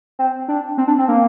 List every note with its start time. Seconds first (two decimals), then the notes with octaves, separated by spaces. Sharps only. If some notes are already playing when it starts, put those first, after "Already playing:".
0.19 C4
0.48 D4
0.78 C4
0.88 D4
0.99 C4
1.08 A#3